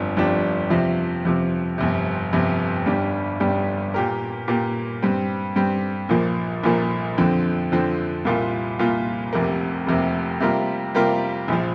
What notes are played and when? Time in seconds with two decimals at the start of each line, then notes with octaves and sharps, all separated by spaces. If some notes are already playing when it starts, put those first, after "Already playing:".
Already playing: G1 F2 F3 D4
0.17 G1 F2 F3 D4 G4
0.70 F2 C3 F3
1.25 F2 C3 F3
1.78 G1 F2 C3
2.33 G1 F2 C3
2.86 G1 G2 G3 D4
3.40 G1 G2 G3 D4
3.94 A#2 A#3 G4 A#4
4.48 A#2 A#3 G4 A#4
5.03 G2 G3 C4
5.56 G2 G3 C4
6.09 A#1 A#2 F3 A#3
6.63 A#1 A#2 F3 A#3
7.18 F2 D3 F3 C4
7.72 F2 D3 F3 C4
8.25 C2 A#2 A#3 F4
8.79 C2 A#2 A#3 F4
9.33 F1 F2 C3 A#3
9.87 F1 F2 C3 A#3
10.40 C3 G3 A#3 F4 A#4
10.95 C3 G3 A#3 F4 A#4
11.48 A#1 A#2 F3